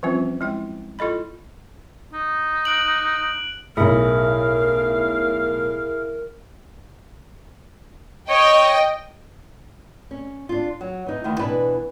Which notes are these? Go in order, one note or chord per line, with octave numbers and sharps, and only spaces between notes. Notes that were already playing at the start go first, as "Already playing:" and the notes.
E3 F3 G3 C4 C#4 F4
G#3 E4 G5
E4 F4 A4 D#5 B5
D#4
F#6 D7 F#7
B1 A2 E4 G#4 A#4 E5 F5
C#5 D#5 G5
C#4
D4 F4
F#3
E3 D#4
D2 D#3 E4
B2 E3 D4 B4